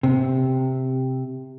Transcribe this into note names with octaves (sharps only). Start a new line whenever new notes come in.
C3